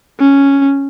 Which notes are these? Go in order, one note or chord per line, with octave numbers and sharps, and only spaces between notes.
C#4